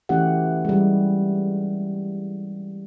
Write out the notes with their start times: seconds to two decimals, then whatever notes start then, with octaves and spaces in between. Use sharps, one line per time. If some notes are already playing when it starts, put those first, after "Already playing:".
0.09 E3 A3 C#4 E4 G4 F#5
0.65 G3 G#3